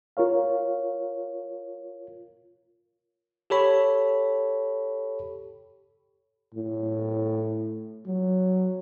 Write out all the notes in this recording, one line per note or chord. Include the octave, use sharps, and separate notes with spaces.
F4 A#4 C#5 F5
G4 A4 C#5 B5
A2
F#3